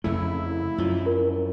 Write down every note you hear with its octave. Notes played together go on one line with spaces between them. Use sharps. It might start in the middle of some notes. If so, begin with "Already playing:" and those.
F2 C#3 A3 E4
F#2 F3 F4 B5
F4 A#4